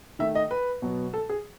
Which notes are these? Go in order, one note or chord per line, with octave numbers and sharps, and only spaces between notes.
D#3 A3 E5
D#5
B4
B2 F#3 B3
A4
G#4